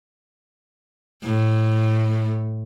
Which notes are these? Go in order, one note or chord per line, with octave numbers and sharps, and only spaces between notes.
A2